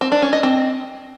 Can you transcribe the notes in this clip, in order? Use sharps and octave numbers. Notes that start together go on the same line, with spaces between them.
C4
D4
C#4
D#5
C4